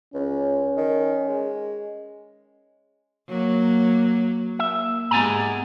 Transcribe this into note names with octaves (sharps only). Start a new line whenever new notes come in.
C#2 C#4
D#3
G#3
F#3 A#3
A#3 E5
G#2 G#3 B3 G4 G#5 A#5